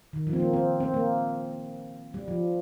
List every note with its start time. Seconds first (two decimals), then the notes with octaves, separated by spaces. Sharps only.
0.13 D#3
0.27 F3
0.33 C4
0.40 A#3
0.53 C4
0.80 C4
0.94 A#3
2.14 G3
2.28 F3